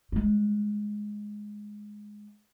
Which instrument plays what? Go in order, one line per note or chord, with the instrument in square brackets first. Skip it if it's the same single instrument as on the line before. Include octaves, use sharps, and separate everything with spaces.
[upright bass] G3 G#3